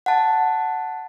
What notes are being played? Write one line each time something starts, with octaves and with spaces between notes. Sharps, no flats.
F#5 A5